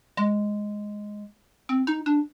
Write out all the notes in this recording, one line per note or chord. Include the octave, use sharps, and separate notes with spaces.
G#3
C4
D#4
D4